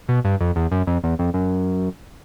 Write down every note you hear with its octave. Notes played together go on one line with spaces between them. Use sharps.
B2
G2
F2
E2
F#2
F2
E2
F2
F#2